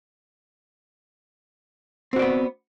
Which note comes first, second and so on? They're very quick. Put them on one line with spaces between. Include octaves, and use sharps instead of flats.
C4 F#4 D5 B3